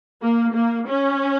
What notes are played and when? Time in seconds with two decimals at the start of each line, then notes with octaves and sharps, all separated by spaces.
0.22 A#3
0.55 A#3
0.88 C#4